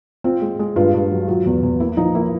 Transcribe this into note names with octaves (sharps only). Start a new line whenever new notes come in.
C4 F4
G#3
G#3
G2 F4
G2
F#3
F#3 F4
E2
E2
A#3 E4
F3 D#4
A#3 E4